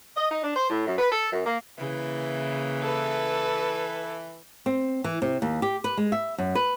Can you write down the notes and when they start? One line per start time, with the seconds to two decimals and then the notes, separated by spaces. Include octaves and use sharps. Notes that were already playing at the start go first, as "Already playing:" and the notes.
0.17 D#5
0.30 D#4
0.43 D4
0.56 C5
0.70 A2
0.87 F#2
0.98 B4
1.11 A4
1.32 F#2
1.45 A#3
1.78 C#3 E3 A#3
2.82 A4 B4
4.66 C4
5.04 E3
5.22 C3
5.42 D#2
5.62 G4
5.84 B4
5.97 G#3
6.12 E5
6.38 F#2
6.55 B4